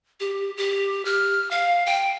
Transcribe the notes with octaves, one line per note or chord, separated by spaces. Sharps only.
G4
G4
F6
F5
G5